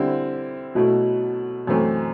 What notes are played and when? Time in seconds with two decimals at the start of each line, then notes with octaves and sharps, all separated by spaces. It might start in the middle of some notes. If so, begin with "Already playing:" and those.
Already playing: D3 G3 C4 E4
0.75 B2 F#3 A3 E4
1.67 F#2 E3 A3 C4